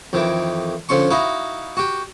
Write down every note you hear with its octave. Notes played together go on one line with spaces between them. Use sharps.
F2 D#3 E3
D3 F3 C#4 C6 C#6
D#4 E4 F#4 F5
F#4 G4